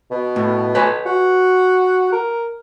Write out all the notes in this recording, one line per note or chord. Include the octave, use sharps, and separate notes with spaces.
B2
A2
B4 C#5 G#5
F#4
A#4